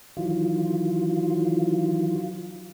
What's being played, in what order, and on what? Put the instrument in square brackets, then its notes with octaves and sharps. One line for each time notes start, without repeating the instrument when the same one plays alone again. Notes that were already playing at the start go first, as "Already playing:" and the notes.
[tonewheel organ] D#3 E3 F#3 F4